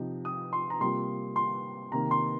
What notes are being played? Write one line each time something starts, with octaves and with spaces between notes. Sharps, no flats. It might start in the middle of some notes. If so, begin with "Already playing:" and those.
Already playing: C3 F3 D#4
D#6
C6
A#5
C3 G3 A#3 F4 C6
C6
C3 D#3 A#3 A#5
C6